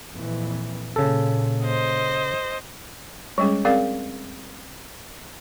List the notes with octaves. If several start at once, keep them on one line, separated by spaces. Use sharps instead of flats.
F2 A#2 E3
A#2 C#3 A4
C5 D#5
G3 G#3 C#4 G#4
C4 G#4 A#4 D5 F5